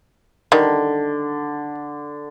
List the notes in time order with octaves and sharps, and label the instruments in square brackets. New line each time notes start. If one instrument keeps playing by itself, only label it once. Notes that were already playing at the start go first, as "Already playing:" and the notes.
[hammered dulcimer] D3 [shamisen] D#3 G3